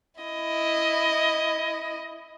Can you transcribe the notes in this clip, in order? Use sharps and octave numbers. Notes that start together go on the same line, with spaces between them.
E4 D#5